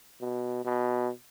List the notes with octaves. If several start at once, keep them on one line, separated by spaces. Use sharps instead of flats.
B2
B2